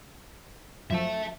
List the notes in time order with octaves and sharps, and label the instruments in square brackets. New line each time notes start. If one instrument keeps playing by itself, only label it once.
[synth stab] F#2 F3 [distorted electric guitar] E5 A5